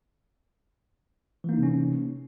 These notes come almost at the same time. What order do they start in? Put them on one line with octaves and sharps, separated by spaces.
E3 A#3 D#4 C3 C#4